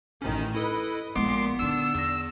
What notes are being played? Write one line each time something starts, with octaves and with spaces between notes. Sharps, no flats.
A1 D#3 C#4
E4 A4 B4 D#5
A#1 A#2 G#3 B3 E4 C6 D6
D3 D4 D#4 E6
E2 A#6